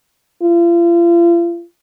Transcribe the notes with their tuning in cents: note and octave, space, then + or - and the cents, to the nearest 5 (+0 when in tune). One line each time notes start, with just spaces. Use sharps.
F4 -40